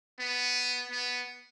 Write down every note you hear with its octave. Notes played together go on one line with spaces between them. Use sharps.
B3
B3